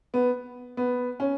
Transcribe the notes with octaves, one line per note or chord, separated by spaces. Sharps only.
B3
B3
C#4